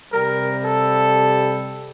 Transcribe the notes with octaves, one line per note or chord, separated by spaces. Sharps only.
C3 G3 A#4
A4